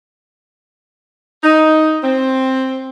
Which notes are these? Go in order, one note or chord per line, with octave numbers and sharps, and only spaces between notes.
D#4
C4